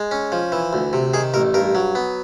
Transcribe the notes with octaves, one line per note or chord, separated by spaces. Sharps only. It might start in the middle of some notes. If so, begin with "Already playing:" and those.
Already playing: G#3
C#4
F3
E3
D2
C3
D#3 G#4
A1 A#4
G2 A#4
F#3
B3